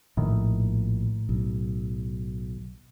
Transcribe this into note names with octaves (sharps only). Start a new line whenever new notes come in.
A#1 A2 D#3
B1